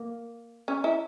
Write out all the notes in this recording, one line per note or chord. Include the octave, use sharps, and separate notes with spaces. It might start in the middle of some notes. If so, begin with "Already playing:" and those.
Already playing: A#3
C#4
E4